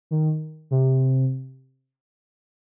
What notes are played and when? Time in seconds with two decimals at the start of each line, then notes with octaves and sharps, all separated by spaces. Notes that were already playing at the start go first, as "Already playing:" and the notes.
0.11 D#3
0.71 C3